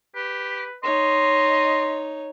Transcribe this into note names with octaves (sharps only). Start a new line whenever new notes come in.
G4 B4
D#4 C#5 D#5 C6